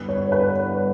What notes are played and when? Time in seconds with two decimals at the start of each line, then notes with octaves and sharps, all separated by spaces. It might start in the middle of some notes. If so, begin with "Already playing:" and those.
Already playing: G2 D3 G3 B3 E4 B4
0.09 C#5
0.32 B4